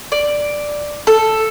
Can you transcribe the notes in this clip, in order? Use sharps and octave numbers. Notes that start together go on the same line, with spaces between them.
D5
A4